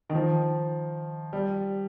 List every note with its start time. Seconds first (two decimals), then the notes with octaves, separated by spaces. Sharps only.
0.10 D#3
0.15 F3
1.33 G3